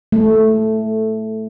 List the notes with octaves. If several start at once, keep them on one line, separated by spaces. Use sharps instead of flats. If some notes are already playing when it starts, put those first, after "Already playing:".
A3